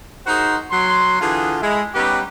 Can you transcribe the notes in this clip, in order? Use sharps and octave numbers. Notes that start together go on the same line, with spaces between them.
D#4 F#4 G#4 A#4 C5
F#3 C6
D3 E3 F4 G#4
G#3 E4
G3 B3 C#4 D#4 G4